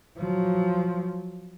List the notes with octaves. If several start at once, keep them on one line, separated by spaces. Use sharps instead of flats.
F3 F#3